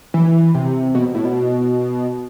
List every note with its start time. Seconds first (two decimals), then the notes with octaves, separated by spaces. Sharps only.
0.14 E3
0.54 C3
0.95 B2
1.15 A2
1.25 B2